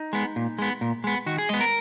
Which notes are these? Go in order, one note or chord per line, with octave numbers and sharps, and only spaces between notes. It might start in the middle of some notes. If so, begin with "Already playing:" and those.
Already playing: D#4
G#3 B3
A#2
G#3 B3
A#2
G#3 B3
D#3 F#4
G#4
G#3 B3 D#5
A#4